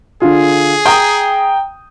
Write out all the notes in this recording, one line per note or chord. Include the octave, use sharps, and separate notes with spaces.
D3 F4 G#4
G5 A#5 D#6